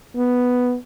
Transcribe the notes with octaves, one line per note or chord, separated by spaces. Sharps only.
B3